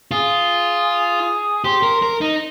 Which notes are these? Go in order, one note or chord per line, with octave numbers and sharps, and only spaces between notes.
F4 G#4
G4 C5
A#4
A#4
D#4